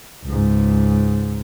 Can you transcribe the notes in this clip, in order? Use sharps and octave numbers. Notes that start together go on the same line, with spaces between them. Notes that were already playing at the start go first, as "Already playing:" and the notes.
C#2 G#2